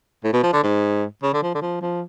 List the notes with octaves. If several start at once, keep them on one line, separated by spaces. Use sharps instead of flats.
A2
B2
F3
D3
G#2
C#3
D3
F3
D3
F3
F3